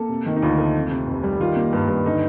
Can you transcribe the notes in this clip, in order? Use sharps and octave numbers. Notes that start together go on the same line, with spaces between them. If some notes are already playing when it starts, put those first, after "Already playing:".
Already playing: A#3 A4
C3
D#3
D#4
D2 F4
A3
F2
C3
F1
G3
D#3 F4
A#3
G2
G2
D3 D#4